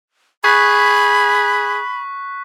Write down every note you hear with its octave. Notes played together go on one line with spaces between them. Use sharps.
G#4 B5 C#6 F#6 B6